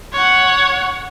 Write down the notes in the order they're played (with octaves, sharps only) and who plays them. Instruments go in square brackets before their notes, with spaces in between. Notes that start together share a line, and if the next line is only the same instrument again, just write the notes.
[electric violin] C#5 F#5